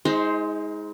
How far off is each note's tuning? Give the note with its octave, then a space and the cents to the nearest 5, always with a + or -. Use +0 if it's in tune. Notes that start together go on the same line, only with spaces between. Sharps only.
G#3 +0 D#4 +40 C5 +0